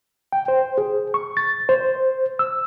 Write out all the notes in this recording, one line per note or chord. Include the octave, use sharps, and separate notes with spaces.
G5
C5
G#4
C#6
A6
C5
E6